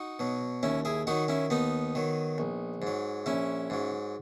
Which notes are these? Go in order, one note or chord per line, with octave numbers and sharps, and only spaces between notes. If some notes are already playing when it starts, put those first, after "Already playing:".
Already playing: D#4 F#4
B2 F#3
D#2 C#4 E4
E4 G#4
D#3 F#3 D#4 F#4
C#4 E4
D#2 B3 D#4
D#3 F#3
A#1
G#2 F#3
A#1 C#4 E4
G#2 F#3